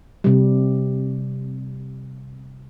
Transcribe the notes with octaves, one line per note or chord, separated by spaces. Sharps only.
C3 G3